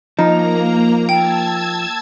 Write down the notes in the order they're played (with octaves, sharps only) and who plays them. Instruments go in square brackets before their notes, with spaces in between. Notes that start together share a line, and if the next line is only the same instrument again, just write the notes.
[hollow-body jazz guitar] F3 [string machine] A#3 A#5 [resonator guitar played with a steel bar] D#4
[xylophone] G5 [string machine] A5 E6 G#6